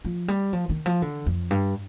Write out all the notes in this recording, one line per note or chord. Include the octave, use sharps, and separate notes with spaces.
F3
G3
F3
D#3
F3
D3
F2
G2